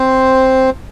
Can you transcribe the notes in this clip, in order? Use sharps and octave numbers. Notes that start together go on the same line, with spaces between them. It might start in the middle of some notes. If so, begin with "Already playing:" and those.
Already playing: C4 C5